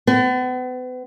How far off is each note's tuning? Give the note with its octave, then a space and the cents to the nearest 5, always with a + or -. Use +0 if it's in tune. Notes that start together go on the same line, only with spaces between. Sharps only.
B3 +40